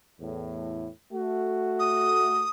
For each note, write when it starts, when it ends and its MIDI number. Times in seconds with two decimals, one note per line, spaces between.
0.19 0.88 40
0.19 0.88 45
1.12 2.46 57
1.12 2.46 66
1.79 2.50 87